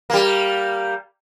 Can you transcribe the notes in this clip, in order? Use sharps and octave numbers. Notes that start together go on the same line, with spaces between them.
G3 A#3